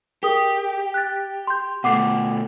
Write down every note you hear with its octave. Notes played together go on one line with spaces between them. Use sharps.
G4 G#4 A#4 D#6
F#6 A6
C6 G6
B2 A3 F#5 D6 C7